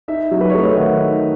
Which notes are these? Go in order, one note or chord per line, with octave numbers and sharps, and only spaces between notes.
D#4 E5
F#3
B4
C#5
A3 D#5
E5
D#3 F#5
D#4